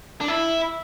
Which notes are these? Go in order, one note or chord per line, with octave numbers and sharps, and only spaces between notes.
D4
E4